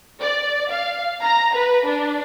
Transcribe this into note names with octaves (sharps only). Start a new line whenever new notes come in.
D5
F5
A#5
B4
D4